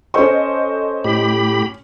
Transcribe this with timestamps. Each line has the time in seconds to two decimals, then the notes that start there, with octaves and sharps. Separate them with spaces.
0.14 C#4 A4 C5 D#5 C#6
1.04 A2 G4 B5